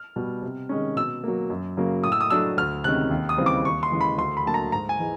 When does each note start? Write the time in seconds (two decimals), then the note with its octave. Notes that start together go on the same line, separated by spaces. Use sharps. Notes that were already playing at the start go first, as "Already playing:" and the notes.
Already playing: F6
0.16 B2 G3
0.42 C3
0.69 D#3 G#3 C#4
0.96 B2 E6
1.24 F#3 A#3
1.50 F#2
1.77 C#3 F#3 A#3
2.04 A2 D#6
2.12 E6
2.21 D#6
2.30 F#3 A3 D4 E6
2.57 D2 F6
2.84 C3 D#3 G#3 C#4 F#6
3.11 D#2
3.29 D#6
3.38 C#3 E3 G3 C4
3.46 D6
3.65 D#2 C#6
3.83 C6
3.91 C#3 E3 G#3
4.01 B5
4.18 D2 C6
4.37 B5
4.45 D3 F#3 A#3 A5
4.54 A#5
4.72 G#2 A#5
4.89 G#5
4.99 E3 G#3